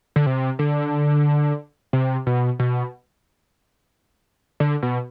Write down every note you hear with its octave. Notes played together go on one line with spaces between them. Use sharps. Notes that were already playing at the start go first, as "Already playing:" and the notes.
D3
C3
D3
C3
B2
B2
D3
B2